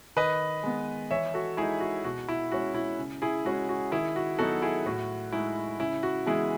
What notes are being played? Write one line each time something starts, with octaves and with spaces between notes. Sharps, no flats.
D#3 B4 D#5
G#3 B3
E3 C#5 E5
F#4 A4
G#3 D#4 E4 G#4
F#4
B2 F#4
E4
G#3 C#4 F#4
E4
C#3
E4 G#4
G#3 C#4 E4 F#4
F#4
D#3 E4 G#4
F#4
F#3 B3 D#4 F#4 A4
E4 G#4
A2 F#4
G#3 D#4 E4
C#3 E4
F#4
E3 G#3 B3 E4 G#4